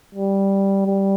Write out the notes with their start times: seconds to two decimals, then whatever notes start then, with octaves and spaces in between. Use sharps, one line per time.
0.14 G3
0.87 G3